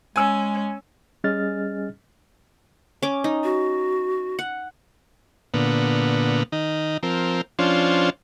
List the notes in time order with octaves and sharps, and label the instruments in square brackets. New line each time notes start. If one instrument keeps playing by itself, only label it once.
[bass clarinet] G#3 [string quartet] C#4 [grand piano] G#5 E6
[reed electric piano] G3 C#4 G#4 D#5 F6 A6
[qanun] C#4 D6
D#4
[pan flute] F#4
[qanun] F#5
[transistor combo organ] A#2 D3 B3
D#3 D#4
F3 C4 A#4
F3 C#4 D4 F4 C5